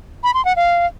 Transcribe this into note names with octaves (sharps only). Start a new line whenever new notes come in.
B5
C6
F#5
F5